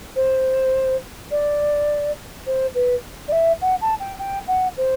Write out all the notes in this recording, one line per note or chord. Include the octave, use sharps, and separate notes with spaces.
C5
D5
C5
B4
D5
E5
F#5
A5
G5
G5
F#5
C5